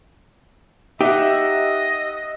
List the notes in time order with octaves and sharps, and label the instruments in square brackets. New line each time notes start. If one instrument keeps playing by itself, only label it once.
[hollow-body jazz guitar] D#4 G4 [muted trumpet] D#5 [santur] E5 F#5